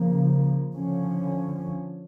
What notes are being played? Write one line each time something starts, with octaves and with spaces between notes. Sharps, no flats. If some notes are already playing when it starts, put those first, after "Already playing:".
Already playing: C#3 F3 A#3
D3 F3 C#4